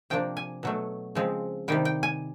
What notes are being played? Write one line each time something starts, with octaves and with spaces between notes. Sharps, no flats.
C3 F3 A#3 D4 G5
G#5
B2 F#3 A3
C#3 F3 G#3 C4
C3 D#3 G3 G5
G5
G#5